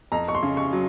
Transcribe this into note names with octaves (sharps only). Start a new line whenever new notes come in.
F2 A#5
C#6
C6
C#3
C#6
F#3